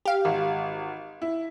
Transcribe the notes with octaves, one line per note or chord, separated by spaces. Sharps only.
G4 F5
G#1
E4